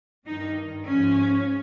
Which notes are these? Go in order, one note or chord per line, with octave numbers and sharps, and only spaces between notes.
G2 D#3 D#4
G#2 F3 C#4